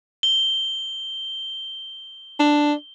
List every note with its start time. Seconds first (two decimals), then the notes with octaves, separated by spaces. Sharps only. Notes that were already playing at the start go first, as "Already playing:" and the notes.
0.23 G7
2.39 D4